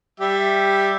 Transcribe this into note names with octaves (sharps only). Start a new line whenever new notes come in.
G3 G4 E5